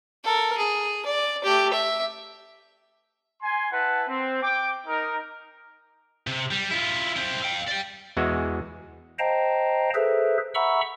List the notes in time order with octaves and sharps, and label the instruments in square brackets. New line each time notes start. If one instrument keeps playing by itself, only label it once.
[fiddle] A4 A#4
G#4
D5
A3 G4
E5
[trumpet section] G#5 C6
E4 B4 F#5 A5
C4
G5 D6
D#4 A#4
[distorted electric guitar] C3
G3
E4 F4
C4 E4
F5 G5
D5 G5
[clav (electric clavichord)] E2 E3 G#3 F#4
[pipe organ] C5 D#5 F5 G5 A5 A#5
G#4 A4 B4 C5 E5
E5 F#5 A#5 B5 C#6 E6